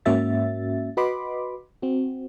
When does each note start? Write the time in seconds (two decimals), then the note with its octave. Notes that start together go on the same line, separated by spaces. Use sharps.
0.05 G#2 A#3 C#4 F#4 E5 A6
0.97 F#4 B4 D#5 B5 C6 D6
1.82 C4 F#4